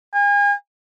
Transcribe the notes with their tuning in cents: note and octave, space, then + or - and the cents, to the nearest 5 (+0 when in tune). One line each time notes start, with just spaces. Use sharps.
G#5 -40